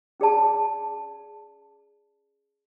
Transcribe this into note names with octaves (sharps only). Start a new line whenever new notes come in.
C#4 G#4 D5 A5